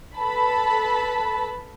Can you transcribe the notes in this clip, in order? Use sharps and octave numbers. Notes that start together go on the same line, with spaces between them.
A4 B4 A5 B5